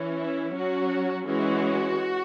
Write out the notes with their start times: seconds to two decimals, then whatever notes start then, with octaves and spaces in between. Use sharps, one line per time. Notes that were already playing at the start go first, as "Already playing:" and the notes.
Already playing: E3 C#4
0.19 E4
0.54 F#3 C#4 F#4
1.25 E3 G#3 C#4 F#4